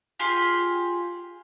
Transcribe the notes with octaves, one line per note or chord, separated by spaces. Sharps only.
F4 G4 G#4